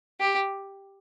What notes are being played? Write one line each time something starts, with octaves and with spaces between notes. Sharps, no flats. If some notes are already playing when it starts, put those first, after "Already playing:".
G4